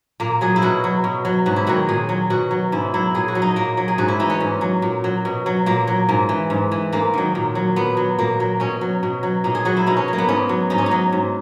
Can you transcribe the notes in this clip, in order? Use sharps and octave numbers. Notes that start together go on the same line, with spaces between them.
A#2 A#3
F#3 G#4
E4
B2 F#4
F#3
B2
F#3
G#2 F#4
E4
D#3 F#3 F#4
A#2 G#4
F#3
B2 F#4
F#3
G#2 E4
F#3 E4
A#2 G#4
F#4
F#3
D#4
A#2 A#3
F#3
G#4
G#2 F#4
E4
E3 D#4
C#4
G#2
F#3
A#2
F#3
B2
F#3
A#2 A#3
F#3
G#2 A#3
E3
G#2
E3
G#2 A#3
D#3 F#3
A#2
F#3
A#2 B3
F#3
A#2 A#3
F#3
B2 C#4
F#3
B2
F#3
A#2 D#4
G#4
F#3 F#4
E4
B2 D#4
C#4
F#3 A#3
B3
G#2 C#4
F#3
G#2 D#4
C#4
D#4
F#3
G#2